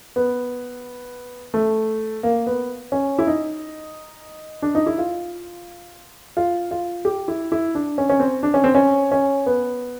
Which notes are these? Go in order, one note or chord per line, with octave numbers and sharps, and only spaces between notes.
B3
A3
A#3
B3
C#4
E4
D#4
D4
D#4
E4
F4
F4
F4
G4
E4
E4
D4
C#4
C#4
C4
D4
C#4
C4
C#4
C#4
B3